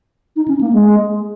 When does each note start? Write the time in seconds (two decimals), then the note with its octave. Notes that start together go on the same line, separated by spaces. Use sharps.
0.36 D#4
0.48 C#4
0.61 A#3
0.73 G#3